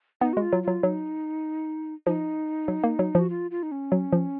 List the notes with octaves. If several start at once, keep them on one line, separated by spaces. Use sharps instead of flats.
B3 D#4
G#3 F#4
F4
F#3
F#3 F4
F#3 D#4
F3 D#4
F#3
A#3
F#3
F3 F#4
F4
F4
D#4
C#4
F#3
F3